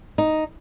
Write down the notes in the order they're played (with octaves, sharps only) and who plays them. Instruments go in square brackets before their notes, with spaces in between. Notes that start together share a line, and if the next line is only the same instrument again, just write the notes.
[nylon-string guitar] D#4